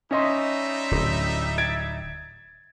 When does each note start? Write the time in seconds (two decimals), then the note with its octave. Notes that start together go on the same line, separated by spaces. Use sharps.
0.11 G3 C#4 D#4 D#5 E5 C6
0.91 D1
1.58 G#6 A6 D7